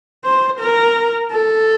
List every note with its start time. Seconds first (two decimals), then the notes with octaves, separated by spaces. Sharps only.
0.25 C5
0.60 A#4
1.32 A4